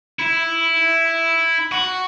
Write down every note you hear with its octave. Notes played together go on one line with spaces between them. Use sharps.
E4
F#4